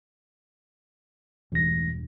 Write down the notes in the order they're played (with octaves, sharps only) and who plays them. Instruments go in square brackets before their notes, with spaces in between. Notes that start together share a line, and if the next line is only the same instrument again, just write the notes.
[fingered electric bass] E1 G2 [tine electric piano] A1 A#6